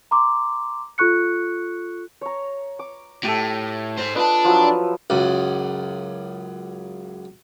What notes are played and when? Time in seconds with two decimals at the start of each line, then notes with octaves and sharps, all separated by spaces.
0.11 A#5 C6 D6
0.98 F4 A4 C#6 F#6 C#7
2.21 C#5 A#5
2.79 D6
3.24 A2 G4 A4
3.97 G#2 C5
4.15 D4 F4 B4 D#5 A5
4.45 F3 F#3 E4
5.10 C#2 F#2